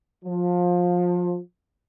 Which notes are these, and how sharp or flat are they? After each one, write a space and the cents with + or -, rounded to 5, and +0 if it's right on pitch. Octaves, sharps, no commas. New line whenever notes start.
F3 +25